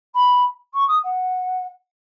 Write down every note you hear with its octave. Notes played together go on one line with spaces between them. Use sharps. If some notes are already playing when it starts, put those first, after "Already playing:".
B5
C#6
D#6
F#5